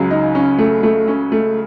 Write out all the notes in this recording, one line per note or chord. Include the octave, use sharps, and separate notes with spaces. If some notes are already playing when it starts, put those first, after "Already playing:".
Already playing: C#2 C#3 F#3
D#4
C#4
A3
A3
C#4
A3